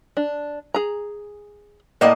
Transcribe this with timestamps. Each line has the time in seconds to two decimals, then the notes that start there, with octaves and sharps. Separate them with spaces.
0.17 D4
0.74 G#4 A#5
2.01 A2 A#3 D5 D#5 F#5